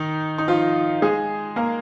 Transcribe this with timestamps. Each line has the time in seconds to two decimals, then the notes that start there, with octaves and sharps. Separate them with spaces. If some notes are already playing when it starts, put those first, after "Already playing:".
Already playing: D#3 D#4
0.38 D#4
0.48 F3 F4
1.02 G#3 G#4
1.56 A#3 A#4